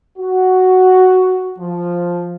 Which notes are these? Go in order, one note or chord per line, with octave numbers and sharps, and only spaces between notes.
F#4
F3